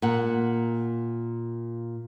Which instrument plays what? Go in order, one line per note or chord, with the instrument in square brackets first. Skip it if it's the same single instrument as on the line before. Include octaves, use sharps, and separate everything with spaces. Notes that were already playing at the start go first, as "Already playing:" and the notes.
[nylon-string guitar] A#2 F#5